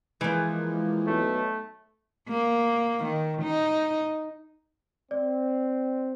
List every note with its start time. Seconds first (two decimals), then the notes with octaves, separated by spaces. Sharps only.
0.21 E3 F3 G#3 A#3
1.07 B1 A3
2.29 A#3
3.04 D#3
3.42 D#4
5.11 C4 D5